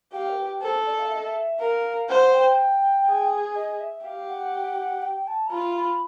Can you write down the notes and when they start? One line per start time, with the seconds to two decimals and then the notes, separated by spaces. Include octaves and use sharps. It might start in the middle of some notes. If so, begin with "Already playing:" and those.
0.13 G4 F5
0.29 A#4
0.37 B4
0.61 A4 C5
0.86 D5
0.99 F5
1.07 E5
1.14 D#5
1.22 E5
1.59 A#4 F5
2.09 C5 F#5
2.33 G5
3.07 G#4
3.55 D#5
3.80 E5
4.04 G4 F5
4.28 F#5
5.02 G5
5.27 A5
5.47 A#5
5.51 F4 B5
5.76 B5